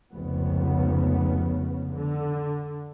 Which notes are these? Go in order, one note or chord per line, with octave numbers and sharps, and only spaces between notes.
F1 C#2 C#3 B3
D3